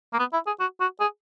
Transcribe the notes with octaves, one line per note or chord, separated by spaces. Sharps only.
A#3
B3
E4
G#4
F#4
F#4
G#4